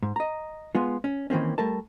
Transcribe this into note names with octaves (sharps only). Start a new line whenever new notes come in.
G#2
D#5 A#5
G#3 B3 F4
C#4
D#3 E3 A#3 C4 C#4
G3 A3 A#4 A5